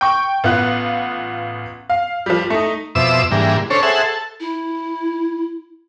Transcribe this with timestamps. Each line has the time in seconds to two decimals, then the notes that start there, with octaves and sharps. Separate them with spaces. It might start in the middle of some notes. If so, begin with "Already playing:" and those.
0.01 G5 C#6
0.44 A1 B3 F4 F#5 F#6
1.90 F5
2.26 F3 G3
2.50 A3 D#4
2.95 F2 B2 C5 E5 D6 E6
3.31 G#2 D3 E3 G3 A#3
3.70 C#4 D4 A4 C5 C#5
3.83 G#4 A4 C5 E5 F#5
4.03 A4
4.40 E4